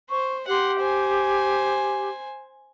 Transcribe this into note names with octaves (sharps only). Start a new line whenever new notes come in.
C5 C#6
G4 F#5 C6
C5 G#5